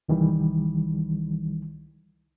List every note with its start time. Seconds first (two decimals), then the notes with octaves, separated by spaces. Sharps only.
0.09 C2 D#3 E3 G3